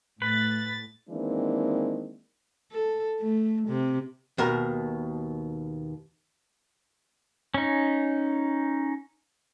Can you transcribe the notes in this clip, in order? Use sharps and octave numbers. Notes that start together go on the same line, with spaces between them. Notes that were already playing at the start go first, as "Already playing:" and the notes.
A2 B4 A6
D#3 E3 G#3 A#3 C4 D4
A4
A3
C3
D#2 B2 A#4
C#4 D#4